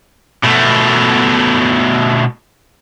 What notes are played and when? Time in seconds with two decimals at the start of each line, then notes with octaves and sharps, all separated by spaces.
0.43 B2 A3